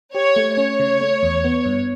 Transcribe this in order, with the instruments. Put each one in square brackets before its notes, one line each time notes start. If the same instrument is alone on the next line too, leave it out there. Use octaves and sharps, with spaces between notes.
[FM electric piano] G4 [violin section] C#5
[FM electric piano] A3
[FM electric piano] C#4 [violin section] C#5
[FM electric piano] C#3
A3
E2
B3
G2